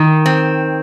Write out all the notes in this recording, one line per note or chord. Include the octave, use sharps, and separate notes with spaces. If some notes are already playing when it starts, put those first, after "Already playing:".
Already playing: D#3
C4